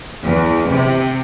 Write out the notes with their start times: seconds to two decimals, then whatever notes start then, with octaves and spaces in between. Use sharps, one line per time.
0.23 E2
0.70 C3